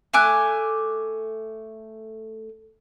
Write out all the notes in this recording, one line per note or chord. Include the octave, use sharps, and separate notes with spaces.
A3 G#5 D6 F#6